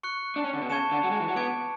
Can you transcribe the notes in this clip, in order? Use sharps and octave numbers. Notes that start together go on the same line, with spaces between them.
C#6 F#6 C#7
D4
C#4
D3
B2
C#3 A5 C#6 G#6 C#7 E7
D3
F#3
G#3
E3
F#3
B3 D6 G#6 D7